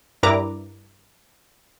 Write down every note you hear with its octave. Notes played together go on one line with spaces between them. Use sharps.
G2 E4 A#4 B4 A#5 D6